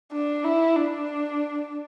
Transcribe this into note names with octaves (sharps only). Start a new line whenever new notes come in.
D4
E4
D4